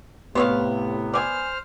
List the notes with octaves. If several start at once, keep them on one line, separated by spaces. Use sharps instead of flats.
A2 C3 B3 C5 C#5 F5
C5 D5 G#5 F6